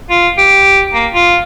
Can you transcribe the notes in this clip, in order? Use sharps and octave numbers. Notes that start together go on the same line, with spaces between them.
F4
G4
A#3
F4